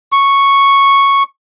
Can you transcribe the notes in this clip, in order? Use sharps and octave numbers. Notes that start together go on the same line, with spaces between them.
C#6